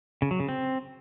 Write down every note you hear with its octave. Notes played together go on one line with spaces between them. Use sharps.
C#3
F#3
C#3
C4